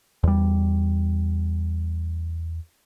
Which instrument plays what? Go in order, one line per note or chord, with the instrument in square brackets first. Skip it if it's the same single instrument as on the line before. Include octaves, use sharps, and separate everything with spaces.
[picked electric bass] E2 G3